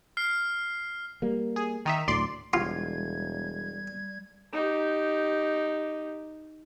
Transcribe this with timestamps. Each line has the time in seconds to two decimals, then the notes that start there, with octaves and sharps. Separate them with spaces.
0.17 F6 C7
1.22 G3 A#3
1.56 G#4
1.86 D#3 D#4 E5
2.08 D2 A2 F#3 D5 C6
2.53 E1 G3 F4 C6 G#6
4.53 D#4 G4